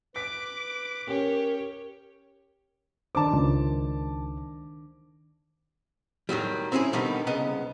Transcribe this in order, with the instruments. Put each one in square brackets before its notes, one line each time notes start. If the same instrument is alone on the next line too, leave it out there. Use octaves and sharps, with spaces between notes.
[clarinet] B4 [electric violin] D6 [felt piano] B6 D7
[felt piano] C#4 [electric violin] G4 C#5 [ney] A#4
[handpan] D#3 D4 C5 [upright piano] A5 D6
[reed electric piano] C#2
[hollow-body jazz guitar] A2 D#3 F#3 G3
C4 C#4 E4 F#4 G#4
B2 D3 D#3 G3 B3 D#4
C2 C#3 B3 D#5